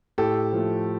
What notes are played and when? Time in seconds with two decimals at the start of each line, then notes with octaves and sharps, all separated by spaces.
0.18 A2 G4 A4
0.53 F3 A3